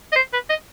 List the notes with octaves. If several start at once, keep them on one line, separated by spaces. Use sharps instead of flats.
D#5
C5
B4
D#5